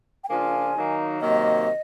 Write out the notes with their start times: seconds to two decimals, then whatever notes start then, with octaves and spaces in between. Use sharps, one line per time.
0.24 G5
0.29 C#3 F3 A#3 D4 F4 G#5
0.75 D#3 F#3 A#3 D#4
1.21 C3 D#3 F#3 A#3 D#5